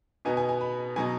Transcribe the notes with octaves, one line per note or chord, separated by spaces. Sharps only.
B2 B3 D#4 G#5
G#5
G#5
B5
B2 F#3 D#4 G#5